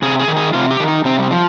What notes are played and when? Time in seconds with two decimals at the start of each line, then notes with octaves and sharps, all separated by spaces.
0.02 C3 G#4
0.19 G#4
0.28 D#3
0.37 G#4
0.53 C3 F4
0.71 G4
0.80 D#3
0.88 D#4
1.05 C3 C4
1.19 G3
1.31 F3